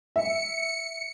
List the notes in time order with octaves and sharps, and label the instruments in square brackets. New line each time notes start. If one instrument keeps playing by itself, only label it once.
[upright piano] E5 [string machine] C#7